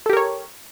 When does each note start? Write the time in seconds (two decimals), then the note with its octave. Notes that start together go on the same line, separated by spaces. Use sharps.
0.06 A4
0.10 G4
0.13 A#4
0.17 C#5